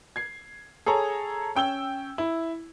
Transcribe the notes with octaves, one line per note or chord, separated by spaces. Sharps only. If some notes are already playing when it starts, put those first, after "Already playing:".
G#6 C7
G#4 A4 C#5 A#5
C#4 G5 E6 G7
E4